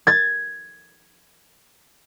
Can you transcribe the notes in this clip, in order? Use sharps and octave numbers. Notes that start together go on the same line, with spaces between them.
G#6 A6